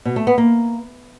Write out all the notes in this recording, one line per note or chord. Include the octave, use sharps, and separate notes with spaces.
B2
A3
B3
A#3